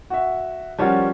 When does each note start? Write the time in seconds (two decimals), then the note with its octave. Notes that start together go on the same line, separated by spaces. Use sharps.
0.10 F#4 E5
0.78 F3 G3 C#4 F4 F#4 A#4